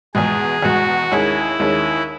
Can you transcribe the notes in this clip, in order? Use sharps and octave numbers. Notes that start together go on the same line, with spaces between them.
E2 B2 G#3 G#4
E2 B2 G#3 F#4
D#2 D#3 G#3 C#4 E4 G#4
D#2 D#3 G#3 C#4 G#4